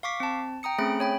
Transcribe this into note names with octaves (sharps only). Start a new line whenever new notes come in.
F5 C#6 D6 B6
C4 A5
G5 A#5 D#6 C#7
A3 C4 C#4 G#4 B5 D7
C#5 G5 B5